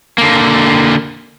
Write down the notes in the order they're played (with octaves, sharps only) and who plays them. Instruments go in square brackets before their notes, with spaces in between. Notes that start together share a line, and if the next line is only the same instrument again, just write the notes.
[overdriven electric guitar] D3 A#3